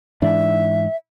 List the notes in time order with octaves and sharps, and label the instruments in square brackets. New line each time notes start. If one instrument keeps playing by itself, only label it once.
[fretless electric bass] G#2 E3 D4 [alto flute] E5